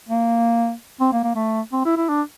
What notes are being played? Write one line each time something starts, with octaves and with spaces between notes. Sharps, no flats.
A#3
C4
A#3
A#3
A3
C4
E4
E4
D4